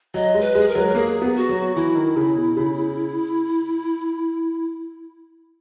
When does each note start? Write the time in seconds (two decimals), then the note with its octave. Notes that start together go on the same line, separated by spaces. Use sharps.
0.14 F#3 D#5
0.34 G#3
0.41 B4
0.55 G#3
0.61 G#4
0.68 A#4
0.75 F#3 B4
0.87 A#4
0.95 A#3 G#4
1.22 B3
1.36 F#4
1.49 F#3
1.76 E3 E4
1.95 D#3
2.16 C#3
2.35 B2
2.56 C#3